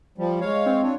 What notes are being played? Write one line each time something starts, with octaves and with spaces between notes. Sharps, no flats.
F3 G3
G#3 C#5 F5
C4
D4 F4 C#5